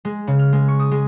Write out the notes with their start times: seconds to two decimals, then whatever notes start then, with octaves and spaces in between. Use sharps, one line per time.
0.05 G#3
0.27 C#3
0.39 F6
0.53 G#3
0.68 C#6
0.79 D#6
0.92 G#3